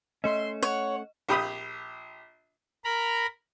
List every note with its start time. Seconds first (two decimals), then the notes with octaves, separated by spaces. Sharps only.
0.24 A3 C#4 D#5 E5 C6
0.62 C#5 F#5
1.29 A#1 G4 B5 D#6
2.84 A#4 A#5 B5